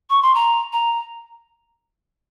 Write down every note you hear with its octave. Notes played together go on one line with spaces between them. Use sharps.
C#6
C6
A#5
A#5